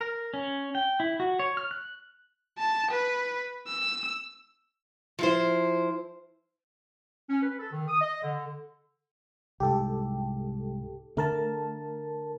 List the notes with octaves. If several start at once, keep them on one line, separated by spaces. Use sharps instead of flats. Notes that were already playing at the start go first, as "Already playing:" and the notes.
A#4
C#4
G5
E4
F#4
C#5
F6
F#6
A5
B4
E6
F3 E4 C5
C#4
B4
A4
D#3
D#6
D#5
D3
C2 G#2 G4 A4
D3 A3 A#4 A5